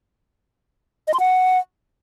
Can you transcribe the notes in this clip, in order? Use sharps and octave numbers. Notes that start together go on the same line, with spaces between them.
D#5
C6
F#5